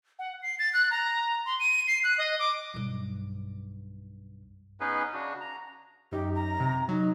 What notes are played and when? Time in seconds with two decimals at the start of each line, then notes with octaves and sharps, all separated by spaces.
0.19 F#5
0.42 C7
0.59 A6
0.73 F#6
0.91 A#5
1.45 C6
1.60 D#7
1.87 C7
2.04 F#6
2.18 D#5
2.39 D6
2.74 B1 G2
4.80 B3 C#4 D#4 G#4 B4
5.13 C#3 D4 F#4
5.41 A#5
6.12 F#2 D#4 G4
6.35 A#5
6.60 C3
6.88 F#3 D#4